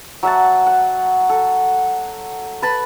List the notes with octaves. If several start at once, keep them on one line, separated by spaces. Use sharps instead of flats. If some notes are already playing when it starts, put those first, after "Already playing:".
F#3 E5 F#5 A5
F#5
A4
B4 A5 B5